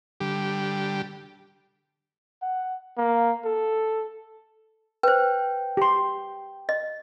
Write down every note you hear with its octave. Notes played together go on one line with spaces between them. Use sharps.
D3 G3 G4
F#5
A#3
A4
B4 C5 G5
G4 C6
D#5